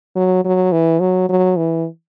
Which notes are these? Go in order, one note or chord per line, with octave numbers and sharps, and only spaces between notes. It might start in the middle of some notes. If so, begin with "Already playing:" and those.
F#3
F#3
E3
F#3
F#3
E3